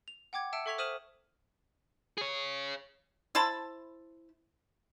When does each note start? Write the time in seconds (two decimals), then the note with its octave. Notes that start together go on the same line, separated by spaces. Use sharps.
0.08 F7
0.33 F#5 G5 D6 G#6
0.53 E5 A5 E6 C#7 D7
0.66 A4 E5 C#6 G#6 B6 F7
0.78 C5 D#6 F6 D#7 E7 F#7
2.18 G#4 C#5
3.35 E4 C5 A5 B5